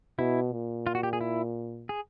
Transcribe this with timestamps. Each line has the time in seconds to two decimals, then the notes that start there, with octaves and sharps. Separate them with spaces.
0.18 B2 E4
0.52 A#2
0.87 F4
0.95 F#4
1.03 G4
1.13 G#4
1.21 E4
1.89 G#4